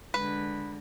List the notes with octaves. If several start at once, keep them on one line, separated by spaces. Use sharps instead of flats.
D3 G#3 B4